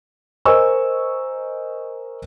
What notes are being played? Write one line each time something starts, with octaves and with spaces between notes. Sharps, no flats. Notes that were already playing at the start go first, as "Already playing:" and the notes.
A#4 C5 D#5 G#5 C#6 E6